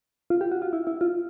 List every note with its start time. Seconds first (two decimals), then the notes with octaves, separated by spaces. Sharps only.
0.30 F4
0.41 G4
0.52 F#4
0.62 F4
0.73 E4
0.87 E4
1.01 F4